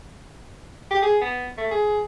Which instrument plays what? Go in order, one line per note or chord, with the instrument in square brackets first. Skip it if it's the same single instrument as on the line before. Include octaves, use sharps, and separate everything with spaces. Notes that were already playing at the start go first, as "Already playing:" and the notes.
[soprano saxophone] G4
G#4
B3
A3
G#4